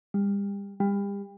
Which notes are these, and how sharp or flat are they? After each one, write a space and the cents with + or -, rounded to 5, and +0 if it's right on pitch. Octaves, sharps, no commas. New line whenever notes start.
G3 +35
G3 +35